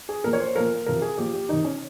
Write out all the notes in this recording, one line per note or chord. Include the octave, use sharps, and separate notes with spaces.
G#4
A#2 F3 A#4
C#5
C5
A#2 F3 A#4
C3 F3 A#4
G#4
A#2 F3 G4
G4
C3 D#3 D#4
C#4